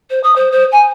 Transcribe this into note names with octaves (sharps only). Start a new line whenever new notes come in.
C5
D#6
C5
C5
G#5